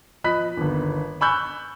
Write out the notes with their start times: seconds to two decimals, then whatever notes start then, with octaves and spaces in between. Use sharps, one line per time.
0.24 F3 D#5 B5 F#6 B6
0.57 G1 D#2
1.21 G#5 B5 C#6 E6 F#6 G6